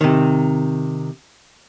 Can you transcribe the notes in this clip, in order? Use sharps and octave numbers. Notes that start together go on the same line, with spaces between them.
C3 D#3